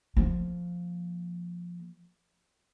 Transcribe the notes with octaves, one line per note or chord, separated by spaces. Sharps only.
F3 A#3